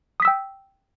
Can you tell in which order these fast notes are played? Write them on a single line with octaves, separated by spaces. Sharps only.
D#6 B6 E6 G5